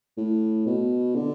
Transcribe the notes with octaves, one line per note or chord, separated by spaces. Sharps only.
A2
B2
D3